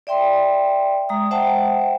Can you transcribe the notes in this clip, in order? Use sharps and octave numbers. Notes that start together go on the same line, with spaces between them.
D5 E5 G5 C6
G#3 A#5 D#6
C5 E5 F#5 G5 A5